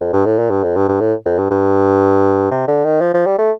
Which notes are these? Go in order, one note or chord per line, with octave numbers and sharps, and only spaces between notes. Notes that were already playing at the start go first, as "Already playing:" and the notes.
F2
G2
A2
A#2
G2
F2
G2
G2
A2
F2
G2
G2
C3
D3
D#3
F3
F3
G3
A3